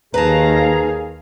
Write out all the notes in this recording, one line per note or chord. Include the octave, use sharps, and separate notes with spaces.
D#2 D#3 G#4 B4 F5 A5 A#5